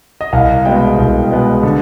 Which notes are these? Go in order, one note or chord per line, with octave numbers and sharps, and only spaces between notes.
D#5
C2 F5
B2 G#3 B3 G5
C2
B2 G#3 B3
D3